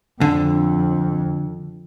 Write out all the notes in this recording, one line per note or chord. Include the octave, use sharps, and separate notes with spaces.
F2 D3